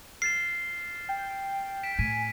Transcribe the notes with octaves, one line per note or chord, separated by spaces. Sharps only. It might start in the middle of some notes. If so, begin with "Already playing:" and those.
F6 A6 C7 E7
G5
B6 D7 E7
A2 G#5 B6 D#7